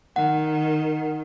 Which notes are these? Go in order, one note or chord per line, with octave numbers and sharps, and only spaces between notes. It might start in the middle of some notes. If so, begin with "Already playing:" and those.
D#3 F#5